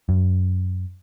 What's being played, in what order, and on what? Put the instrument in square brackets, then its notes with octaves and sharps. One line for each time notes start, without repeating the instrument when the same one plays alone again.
[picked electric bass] F#2